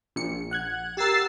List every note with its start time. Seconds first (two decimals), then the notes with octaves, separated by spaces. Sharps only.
0.16 A#1 C#7
0.51 F#5 F#6 G#6
0.97 G4 A#4 E6 A6 C7